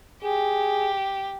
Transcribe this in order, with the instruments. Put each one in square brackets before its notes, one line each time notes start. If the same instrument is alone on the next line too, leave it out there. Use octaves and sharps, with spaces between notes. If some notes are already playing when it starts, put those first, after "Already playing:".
[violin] G4 [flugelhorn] G#4